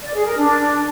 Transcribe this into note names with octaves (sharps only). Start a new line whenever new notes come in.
D5
G#4
A#4
D4